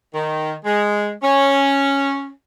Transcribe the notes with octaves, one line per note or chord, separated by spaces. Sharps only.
D#3
G#3
C#4